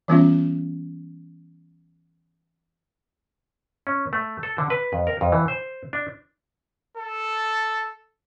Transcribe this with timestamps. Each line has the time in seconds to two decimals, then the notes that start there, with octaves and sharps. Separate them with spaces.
0.08 E3 G3 B3 C#4 F4
3.87 C#4
4.13 A3
4.43 A4
4.58 D3
4.70 B4
4.93 F2
5.07 A#4
5.21 F2
5.32 E3
5.48 C5
5.93 D4
6.97 A4